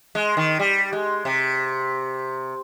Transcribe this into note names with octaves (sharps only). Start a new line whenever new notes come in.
G#3
D#3
G3
G#3
C3